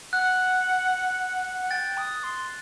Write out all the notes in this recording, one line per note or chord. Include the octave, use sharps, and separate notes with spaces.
F#5 F#6
F#5
G5 A6
D#6
C6